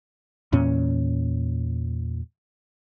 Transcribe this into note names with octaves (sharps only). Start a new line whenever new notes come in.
E2 A#2 C#4